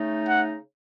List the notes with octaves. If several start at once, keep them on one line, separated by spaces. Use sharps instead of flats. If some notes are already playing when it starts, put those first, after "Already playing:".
Already playing: C#3 A3 D#4
F#5